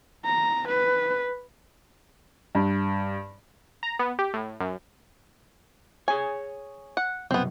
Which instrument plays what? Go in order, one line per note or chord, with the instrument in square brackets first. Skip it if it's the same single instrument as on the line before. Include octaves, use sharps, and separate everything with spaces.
[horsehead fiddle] A#5
B4
[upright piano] G2
[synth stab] A#5
B3
G4
A2
F#2
[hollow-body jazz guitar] G#4 C#5 [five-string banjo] G#5
[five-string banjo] F#5
[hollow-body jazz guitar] C2 F#2 B2 [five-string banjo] B3 C4